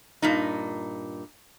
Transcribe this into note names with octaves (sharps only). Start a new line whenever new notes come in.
G2 A#2 D#4